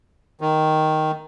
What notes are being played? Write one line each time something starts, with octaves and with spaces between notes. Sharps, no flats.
D#3